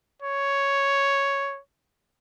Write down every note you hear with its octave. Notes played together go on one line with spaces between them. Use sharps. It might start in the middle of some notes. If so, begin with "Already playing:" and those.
C#5